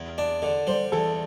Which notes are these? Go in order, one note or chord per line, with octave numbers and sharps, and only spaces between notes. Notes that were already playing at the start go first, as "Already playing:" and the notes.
Already playing: E2
D4 D5
D3 D5
G3 C5
E2 A4